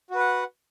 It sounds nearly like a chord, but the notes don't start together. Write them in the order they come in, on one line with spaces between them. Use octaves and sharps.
F#4 B4 F#5